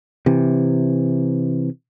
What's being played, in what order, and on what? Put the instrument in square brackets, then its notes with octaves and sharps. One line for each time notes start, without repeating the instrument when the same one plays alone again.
[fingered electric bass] C3 E3